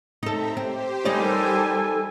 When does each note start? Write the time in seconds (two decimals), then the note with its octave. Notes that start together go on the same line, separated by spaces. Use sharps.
0.23 C4 D#4 A4 E5 A#5
0.57 C4 G4 C5
1.05 G3 D#4 A4 A#4 D5 G#5